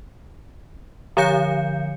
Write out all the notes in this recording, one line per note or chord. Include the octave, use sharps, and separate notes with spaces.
D3 F3 C#5 F5 G6 C#7